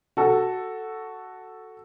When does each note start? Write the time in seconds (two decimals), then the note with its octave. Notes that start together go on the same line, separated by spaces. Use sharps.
0.17 F#4 A4